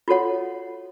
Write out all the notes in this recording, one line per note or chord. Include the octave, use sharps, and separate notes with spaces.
F4 F#4 A4 C#5 F#5